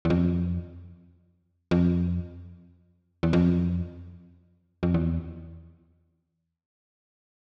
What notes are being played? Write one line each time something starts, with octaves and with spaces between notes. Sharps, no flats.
E2
F2
F2
E2
F2
F2
E2